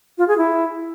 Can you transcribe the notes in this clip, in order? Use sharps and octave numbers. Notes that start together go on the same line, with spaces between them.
F4
G#4
E4